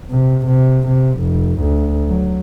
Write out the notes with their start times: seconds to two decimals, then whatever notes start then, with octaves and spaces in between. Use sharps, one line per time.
0.11 C3
0.46 C3
0.87 C3
1.20 F1
1.60 D2
2.09 F#3